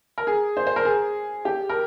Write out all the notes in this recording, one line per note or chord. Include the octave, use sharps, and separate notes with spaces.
A#4
G#4
C5
C5
A#4
G#4
G4
A#4